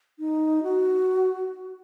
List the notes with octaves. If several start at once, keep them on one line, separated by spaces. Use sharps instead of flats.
D#4
F#4